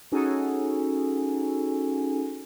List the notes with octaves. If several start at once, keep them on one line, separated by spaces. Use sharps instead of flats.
C#4 D#4 F#4 G#4 A4 G#5